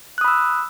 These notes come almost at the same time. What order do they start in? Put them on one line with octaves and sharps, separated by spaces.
F#6 D#6 B5 E6